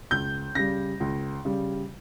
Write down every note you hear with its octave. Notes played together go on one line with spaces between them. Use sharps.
C#2 G6
C#3 G3 A#6
C#2
C#3 G3